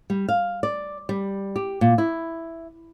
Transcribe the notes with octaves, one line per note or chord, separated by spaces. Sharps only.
G3
F5
D5
G3
G4
A#2
E4